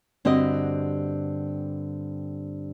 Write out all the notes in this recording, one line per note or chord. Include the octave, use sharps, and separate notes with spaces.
G2 D3 C4 F#4 G4 D#5